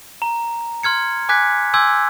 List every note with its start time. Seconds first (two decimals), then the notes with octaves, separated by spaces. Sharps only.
0.22 A#5
0.83 C6 F6 G#6 C#7
1.29 G#5 D6 F#6 G#6 B6
1.74 G#5 C6 D6 E6 G6 G#6